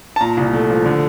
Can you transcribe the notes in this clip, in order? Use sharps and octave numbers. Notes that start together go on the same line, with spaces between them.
A5
A#2 A#5
C2
A3
F3
D3